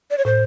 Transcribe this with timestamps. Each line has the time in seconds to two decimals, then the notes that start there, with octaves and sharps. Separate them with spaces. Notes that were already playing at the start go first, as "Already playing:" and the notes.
0.11 D5
0.18 C#5
0.25 A2 C5